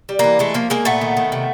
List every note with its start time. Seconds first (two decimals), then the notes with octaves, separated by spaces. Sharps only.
0.09 G3
0.19 E3 A#3
0.39 G#3 A3
0.54 F3 A#3
0.70 G#3 A#3
0.85 A#2 A3 B3
1.01 D#3
1.17 D#3
1.32 C3